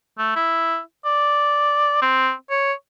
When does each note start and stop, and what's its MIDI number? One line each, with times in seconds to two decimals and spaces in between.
0.18 0.32 57
0.36 0.79 64
1.05 2.01 74
2.02 2.32 60
2.50 2.73 73